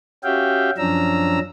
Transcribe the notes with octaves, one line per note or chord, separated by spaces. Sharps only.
C#4 F#4 G4 E5 F5 G5
F#2 F3 C#4 D4 A#5 E6